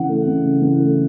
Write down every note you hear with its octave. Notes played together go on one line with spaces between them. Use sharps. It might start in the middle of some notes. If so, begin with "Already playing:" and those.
Already playing: C#3 E3 F#5
A3
C#3
C#3
E3
A3